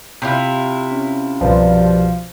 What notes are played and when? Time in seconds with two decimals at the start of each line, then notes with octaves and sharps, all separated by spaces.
0.22 C3 E4 F4
0.92 C#4
1.41 C2 G2 B2 F3